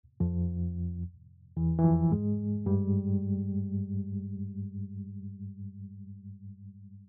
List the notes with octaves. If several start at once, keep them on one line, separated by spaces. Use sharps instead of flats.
F2 F3
E2 E3
E3
F2 F3
G#2 G#3
G2 G3